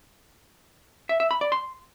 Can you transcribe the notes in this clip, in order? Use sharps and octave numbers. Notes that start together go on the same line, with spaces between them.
E5
E5
B5
D5
C6